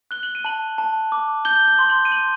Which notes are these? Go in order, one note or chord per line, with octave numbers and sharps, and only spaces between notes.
F#6 G7
F#7
D#7
A5 F#7
A5
D6
G6 G7
G7
C6
F#7
D#7
C6 F#7